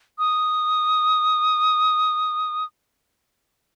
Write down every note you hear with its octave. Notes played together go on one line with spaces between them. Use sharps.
D#6